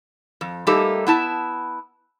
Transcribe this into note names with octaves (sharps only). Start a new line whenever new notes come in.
F2
G3 A3 A#3 D#4 G4 A4
B3 E4 A5